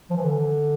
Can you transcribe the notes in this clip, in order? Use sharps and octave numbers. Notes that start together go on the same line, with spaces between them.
F3
E3
D3